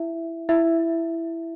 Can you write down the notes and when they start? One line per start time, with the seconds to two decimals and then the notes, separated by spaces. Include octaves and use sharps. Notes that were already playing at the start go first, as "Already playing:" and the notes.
Already playing: E4 E5
0.49 E4 E5